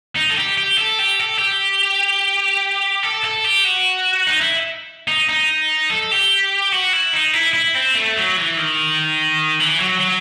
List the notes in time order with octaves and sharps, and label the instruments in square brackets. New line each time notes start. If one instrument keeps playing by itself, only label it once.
[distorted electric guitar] D#4
A4
G4
G4
A4
G4
A4
G4
A4
A4
G4
F#4
D#4
E4
D#4
D#4
A4
G4
F#4
E4
D#4
E4
E4
C4
A3
F#3
E3
D#3
E3
F#3
F#3